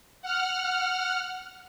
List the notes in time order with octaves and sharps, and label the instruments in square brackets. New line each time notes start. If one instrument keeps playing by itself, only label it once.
[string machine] F#5 F6